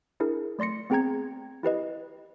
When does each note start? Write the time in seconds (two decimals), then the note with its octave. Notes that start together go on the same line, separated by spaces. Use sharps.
0.20 D4 E4 G#4 A#4
0.59 A3 D5 C6 A#6 C#7
0.90 B3 C4 G#4 G5 A#5 G#6
1.63 E4 G4 B4 D#5